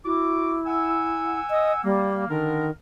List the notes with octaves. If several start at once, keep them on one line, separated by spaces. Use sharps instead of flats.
E4 F#4 D6
F#5 G#5 E6
D#5
G3 A#3
D3 D#3 D4 A#4